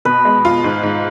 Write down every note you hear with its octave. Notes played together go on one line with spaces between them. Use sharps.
B2 B4
G#3
F4
G#2
G#2